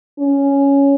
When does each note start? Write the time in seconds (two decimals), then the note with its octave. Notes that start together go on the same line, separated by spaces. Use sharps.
0.19 C#4